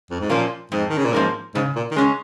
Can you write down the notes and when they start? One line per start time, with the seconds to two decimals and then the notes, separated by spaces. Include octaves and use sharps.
0.10 F2
0.20 G#2
0.30 A#2 F3 A#3 C#4
0.72 F2 G#2
0.90 D#3
0.98 C#3
1.05 A#2
1.13 G#2 F3 A#3 C#4
1.55 G#2 C#3
1.76 A#2
1.91 D#3
1.96 C#3 G#3 C#4